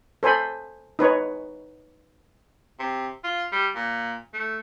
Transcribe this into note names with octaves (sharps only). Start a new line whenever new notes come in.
A4 C5 G#5 B5
D#4 B4 C#5
C3
F4
G3
A#2
A3